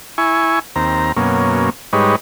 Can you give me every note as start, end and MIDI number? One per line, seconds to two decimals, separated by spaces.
0.18 0.59 64
0.18 0.59 80
0.18 0.59 85
0.76 1.12 39
0.76 1.12 60
0.76 1.12 82
1.17 1.70 42
1.17 1.70 47
1.17 1.70 58
1.17 1.70 61
1.93 2.16 44
1.93 2.16 55
1.93 2.16 63
1.93 2.16 71
1.93 2.16 73